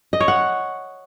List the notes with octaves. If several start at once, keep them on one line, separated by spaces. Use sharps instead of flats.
D#5
C#5
F#5